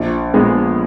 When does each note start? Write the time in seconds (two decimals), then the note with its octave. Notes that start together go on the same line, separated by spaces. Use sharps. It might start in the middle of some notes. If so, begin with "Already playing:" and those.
Already playing: A#1
0.34 A#2 G#3 B3